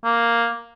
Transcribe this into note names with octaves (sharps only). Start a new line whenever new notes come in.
A#3